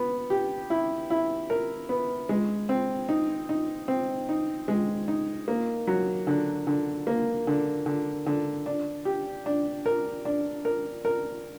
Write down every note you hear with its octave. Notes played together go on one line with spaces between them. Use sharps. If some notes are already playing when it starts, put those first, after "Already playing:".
Already playing: B3
G4
E4
E4
A#4
B3
G#3
C4
D#4
D#4
C4
D#4
G#3
D#4
A#3
F#3
D3
D3
A#3
D3
D3
D3
D4
G4
D4
A#4
D4
A#4
A#4